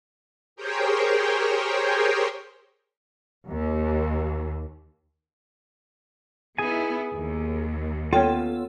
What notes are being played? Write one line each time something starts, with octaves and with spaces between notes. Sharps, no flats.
G4 G#4 A#4 C5 C#5 G5
D#2
B3 D#4 E4 G#4 G#5
D#2
B3 C#4 F4 A4 G5